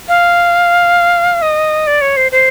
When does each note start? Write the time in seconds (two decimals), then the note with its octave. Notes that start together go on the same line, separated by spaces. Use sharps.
0.08 F5
1.42 D#5
1.87 D5
2.01 C#5
2.17 C5
2.32 C5